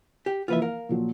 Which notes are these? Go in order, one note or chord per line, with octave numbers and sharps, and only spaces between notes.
G4
E3 F3 A#3 F4 B4 E5
A#4 F5
A#2 F3 F#3